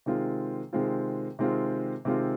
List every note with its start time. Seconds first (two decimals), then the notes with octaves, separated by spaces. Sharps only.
0.06 C3 D#3 G#3 C4 F4
0.73 C3 D#3 G#3 C4 F4
1.39 C3 D#3 G#3 C4 F4
2.05 C3 D#3 G#3 C4 F4